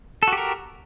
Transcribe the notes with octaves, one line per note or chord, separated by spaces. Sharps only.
F#4 G4 A4 A#4